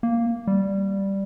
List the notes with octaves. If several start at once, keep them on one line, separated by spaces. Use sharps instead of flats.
A#3
G3